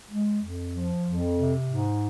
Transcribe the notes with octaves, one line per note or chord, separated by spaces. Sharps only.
G#3
F2
F3
F2
C3
G#2